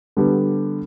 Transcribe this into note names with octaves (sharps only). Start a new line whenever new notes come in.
D3 G3 B3 G4